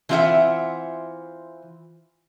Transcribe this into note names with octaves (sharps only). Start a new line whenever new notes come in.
E3 C4 F4 G4 E5 F#5